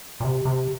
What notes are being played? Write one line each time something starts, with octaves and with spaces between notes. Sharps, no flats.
A#2
C3
C3